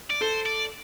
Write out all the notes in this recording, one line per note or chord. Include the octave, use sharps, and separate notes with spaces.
D5
A4 C5
D5